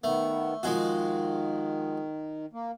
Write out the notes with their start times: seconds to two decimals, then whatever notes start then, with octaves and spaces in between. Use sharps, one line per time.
0.04 D#3 A3 B3
0.63 D#3 F3 G#3 F#4
2.53 A#3